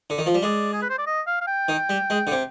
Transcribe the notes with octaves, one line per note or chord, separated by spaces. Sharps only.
D3
D#3
F3
G3
G#3 D5
G#4
B4
C5
D5
D#5
F5
F5
G5
D#3
G3
G#3
D3
C3